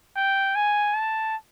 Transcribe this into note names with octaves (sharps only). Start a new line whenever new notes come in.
G5
G#5
A5